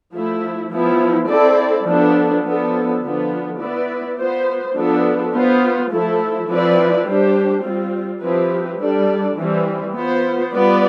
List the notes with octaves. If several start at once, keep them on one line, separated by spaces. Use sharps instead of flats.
F3 A3 E4
F3 B3 E4
C4 E4 A4 D5
F3 B3 D4 A4
F3 B3 D4 A4
D3 F3 B3 D4 F4
B3 E4 B4 D5
B3 F4 C5
F3 B3 D4 A4
B3 F4 C5
F3 A3 E4 A4
F3 C4 E4 B4 D5
G3 D4 G4 C5
G3 C4 F4
F3 C4 E4 G4 B4
G3 D4 A4 D5
E3 G3 C4
B3 F4 C5
G3 B3 F4 B4 D5